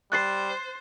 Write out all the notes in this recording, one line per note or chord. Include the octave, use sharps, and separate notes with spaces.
G3 C5 F#6 A6 C7